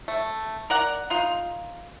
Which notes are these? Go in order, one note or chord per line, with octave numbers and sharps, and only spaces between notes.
A3
A#4 D5 F#5
D#4 F4